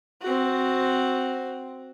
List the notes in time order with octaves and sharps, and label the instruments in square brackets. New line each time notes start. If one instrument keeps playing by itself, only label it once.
[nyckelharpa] C4 F#4